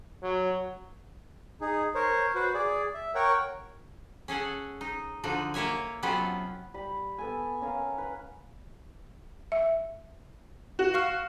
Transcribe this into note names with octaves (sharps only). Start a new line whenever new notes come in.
F#3
D#4 G#4
A#4 C5 C#5
F#4 B4 C5
G#4 D5
E5
A#4 C#5 F#5 G5 C#6
C#4 G#4 A4 F#5
D#4
D3 F3 D#4 F#4
A#3 A#4 C#5 E5 G#5
C3 F#3 B3 C#4 F4 A4
G3 B5
B3 A4 G#5
C#4 A#4 C#5 F5
B4 F#5
E5
F#4
F5 C#6 F6